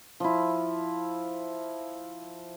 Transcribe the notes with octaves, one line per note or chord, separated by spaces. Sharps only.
F3 E4